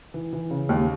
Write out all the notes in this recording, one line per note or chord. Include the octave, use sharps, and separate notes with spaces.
E3
E3
C#3
D#2